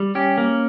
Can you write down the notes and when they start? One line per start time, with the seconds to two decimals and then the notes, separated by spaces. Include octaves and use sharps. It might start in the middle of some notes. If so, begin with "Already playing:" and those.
Already playing: G3
0.15 C#4 G4
0.38 A#3